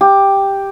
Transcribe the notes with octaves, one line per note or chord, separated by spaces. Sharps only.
G4